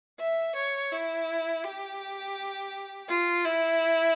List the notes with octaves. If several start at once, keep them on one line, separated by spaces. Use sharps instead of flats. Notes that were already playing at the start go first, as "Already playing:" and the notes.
E5
C#5
E4
G4
F4
E4